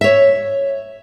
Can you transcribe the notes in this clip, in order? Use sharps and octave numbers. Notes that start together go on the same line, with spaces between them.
C#5 E5